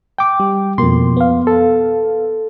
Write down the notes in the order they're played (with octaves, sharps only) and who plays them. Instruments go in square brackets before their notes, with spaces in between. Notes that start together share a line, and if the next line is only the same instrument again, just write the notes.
[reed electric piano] G5 D6
[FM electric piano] G3
[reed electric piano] F2 C6 [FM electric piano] B2 A#3
[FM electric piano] B3 F5
[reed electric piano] A4